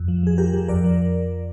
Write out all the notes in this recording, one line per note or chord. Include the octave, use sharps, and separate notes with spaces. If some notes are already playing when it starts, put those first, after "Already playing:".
Already playing: F2
F3
F3 G#4
F3 G4 A#4
F3
F2 A#4 D5
F3